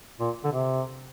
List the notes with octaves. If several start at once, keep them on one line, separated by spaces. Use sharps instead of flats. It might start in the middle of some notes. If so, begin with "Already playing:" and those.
A#2
D3
C3